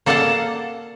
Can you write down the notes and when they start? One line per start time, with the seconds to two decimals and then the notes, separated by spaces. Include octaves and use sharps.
0.06 A#3 A4 D5 F5 F#5 A5